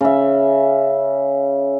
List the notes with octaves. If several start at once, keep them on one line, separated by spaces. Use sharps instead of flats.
C#3 E5